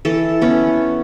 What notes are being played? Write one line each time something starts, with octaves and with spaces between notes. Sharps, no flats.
E3 A4
B3 C#4